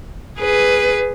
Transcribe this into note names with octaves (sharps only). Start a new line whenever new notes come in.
G#4 B4